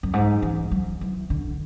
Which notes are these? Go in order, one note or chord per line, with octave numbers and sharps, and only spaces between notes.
F#2
G#2
E3
F#3
E3
D3